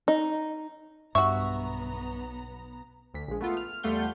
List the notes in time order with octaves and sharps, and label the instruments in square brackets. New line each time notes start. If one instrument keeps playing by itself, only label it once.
[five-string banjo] D#4
[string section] B1 B3 A#5 [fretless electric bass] G2 [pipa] F#4 E5 [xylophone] C#6
[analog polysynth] D2 B6
A#1 G#3
A3 B3 F4
F6
E2 G3 A3 F4 F#5 G6